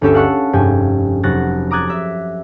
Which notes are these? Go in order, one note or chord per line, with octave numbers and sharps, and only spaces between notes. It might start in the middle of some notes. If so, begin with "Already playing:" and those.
G1 D2 C#4 G4 A4 E5
F5 F#5 A5 C#6 E6 F#6
F1 G2 G5 G#5
F1 F#3 F#6 A6 A#6
A#5 D6 D#6 F#6 G#6 A6
E5 A#5